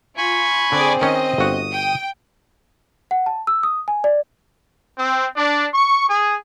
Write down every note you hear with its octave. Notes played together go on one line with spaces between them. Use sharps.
F4 G#5 B5 C#6
D3 C4 G#4 D5
D#3 C#4 D#5
G1 F#4 D#6
G5
F#5
A5
E6
D#6
G#5
D5
C4
D4
C#6
G#4